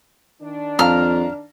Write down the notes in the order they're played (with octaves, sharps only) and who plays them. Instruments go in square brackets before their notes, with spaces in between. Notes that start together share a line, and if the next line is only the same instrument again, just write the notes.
[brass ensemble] D#3 D4
[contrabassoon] F2 [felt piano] F5 A5 A#5 [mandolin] F6